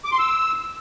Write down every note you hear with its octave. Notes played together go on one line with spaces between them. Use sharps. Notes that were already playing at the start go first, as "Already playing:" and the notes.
D6
C6
E6